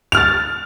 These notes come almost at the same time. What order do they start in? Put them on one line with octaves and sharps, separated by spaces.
F7 F6 A6